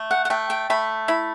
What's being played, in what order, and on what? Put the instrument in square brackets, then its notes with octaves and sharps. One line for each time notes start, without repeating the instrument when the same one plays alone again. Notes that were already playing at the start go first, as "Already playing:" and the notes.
Already playing: [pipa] A3
[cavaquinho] F#5
F#5
[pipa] A3 [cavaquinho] G5
[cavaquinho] G5
[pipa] A3 [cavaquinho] B5
[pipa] E4 [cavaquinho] B5